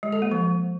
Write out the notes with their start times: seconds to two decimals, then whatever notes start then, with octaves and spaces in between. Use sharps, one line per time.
0.03 G#3
0.12 A4
0.22 A#3
0.31 F3